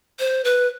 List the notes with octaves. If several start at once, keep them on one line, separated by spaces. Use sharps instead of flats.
C5
B4